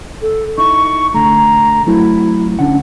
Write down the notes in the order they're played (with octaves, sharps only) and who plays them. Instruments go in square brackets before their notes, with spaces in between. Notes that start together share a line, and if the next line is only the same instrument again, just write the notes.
[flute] A4
[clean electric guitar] D#4 E4 [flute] C#6
[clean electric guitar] D3 A3 [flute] A#5
[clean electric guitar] F#3 A3 C4 [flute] E4
[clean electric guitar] D3 C#4 F#5